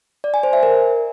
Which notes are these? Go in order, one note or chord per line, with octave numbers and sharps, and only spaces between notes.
D5
G#5
C5
E5
A#4